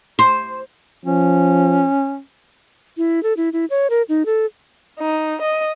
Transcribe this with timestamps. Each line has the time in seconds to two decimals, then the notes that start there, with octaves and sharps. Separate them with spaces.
0.19 C5
1.05 F3 C#4
2.97 E4
3.23 A4
3.37 E4
3.53 E4
3.70 C#5
3.90 A#4
4.09 D#4
4.26 A4
4.99 D#4
5.41 D#5